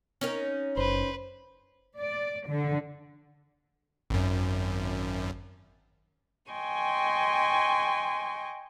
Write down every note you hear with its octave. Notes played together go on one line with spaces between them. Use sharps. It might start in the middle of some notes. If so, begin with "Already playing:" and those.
C#4 D#4 A#4
F#1 B4 C5
D5
D3
G#1 F#2
D#5 G5 G#5 C6 C#6